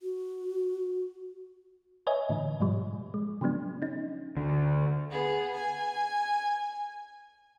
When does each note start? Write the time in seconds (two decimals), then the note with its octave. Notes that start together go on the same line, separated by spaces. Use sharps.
0.03 F#4
2.07 B4 C#5 D#5 E5 G#5
2.30 A2 D3 E3
2.60 G#2 B2 F3 G3
3.14 G#3
3.41 C#3 F3 F#3 B3 D4
3.82 C#4 D#4
4.37 D2 D3
5.11 B3 G#4
5.55 G#5